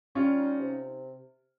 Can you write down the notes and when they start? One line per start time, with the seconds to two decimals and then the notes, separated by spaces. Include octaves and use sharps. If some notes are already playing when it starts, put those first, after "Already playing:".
0.15 G3 C#4 F4
0.38 D#4
0.60 C3